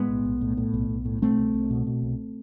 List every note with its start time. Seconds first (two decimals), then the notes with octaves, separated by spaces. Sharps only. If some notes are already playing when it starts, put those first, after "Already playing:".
Already playing: A2 G#3 B3
0.09 B1
0.25 B1
0.41 A2
0.57 A2
0.74 B1
0.90 B1
1.05 A2
1.22 B2 A3 C4
1.38 C2
1.54 C2
1.70 B2
1.87 B2
2.03 C2